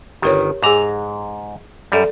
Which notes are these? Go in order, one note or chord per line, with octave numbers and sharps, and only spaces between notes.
G1 D#3 G4 A#4 C#5
G#2 G#4 G#5 A#5 D6
F#2 G3 A4 D5